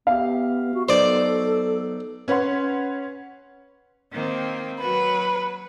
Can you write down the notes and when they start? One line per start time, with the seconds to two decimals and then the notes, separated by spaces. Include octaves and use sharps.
0.07 B3 G4 E5 F5
0.74 F#4
0.89 F#3 B3 D#4 A4 C5 D5
2.28 C#4 B4 C#5 F#5 C6
4.12 D#3 A#3 C4
4.82 F#3 F#4 B4